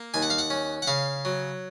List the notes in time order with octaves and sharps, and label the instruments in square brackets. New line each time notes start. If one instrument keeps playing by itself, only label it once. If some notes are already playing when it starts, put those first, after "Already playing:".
Already playing: [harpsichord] A#3
D#2 G#5
F#5
F5
F#5
C#4
F#5
C#3 F5
F#3